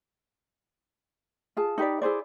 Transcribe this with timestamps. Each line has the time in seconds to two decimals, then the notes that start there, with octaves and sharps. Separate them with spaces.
1.57 F4 G#4 A5
1.78 D#4 G4 B4 D5
2.02 E4 G#4 C5 D5